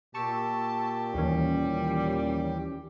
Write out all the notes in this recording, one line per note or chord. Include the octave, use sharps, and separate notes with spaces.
A#2 G4 A5 C#6 E6
D#2 E3 G3 C#4